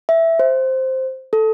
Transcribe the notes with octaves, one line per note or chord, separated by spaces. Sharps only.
E5
C5
A4